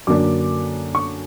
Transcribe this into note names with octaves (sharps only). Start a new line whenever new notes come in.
F#2 D3 A#3 D4 D6
C#6